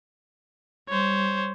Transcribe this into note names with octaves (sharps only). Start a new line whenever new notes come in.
G3 C5 C#5